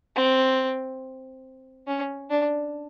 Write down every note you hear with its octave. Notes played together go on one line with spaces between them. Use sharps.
C4
C#4
D4